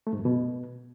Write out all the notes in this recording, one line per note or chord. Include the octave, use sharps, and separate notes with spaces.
A3
G#2
F#2
B2